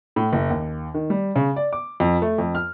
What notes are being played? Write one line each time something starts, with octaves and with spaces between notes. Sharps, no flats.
A2
F#1
D#2
D#3
G3
C#3
D5
D6
F2
A3
F2
F6